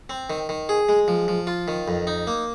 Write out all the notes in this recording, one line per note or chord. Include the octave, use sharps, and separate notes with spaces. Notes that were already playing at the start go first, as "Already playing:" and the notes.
C4
D#3
D#3
G#4
G#3
F3
F3
F4
D#3
F2
D#4
A#3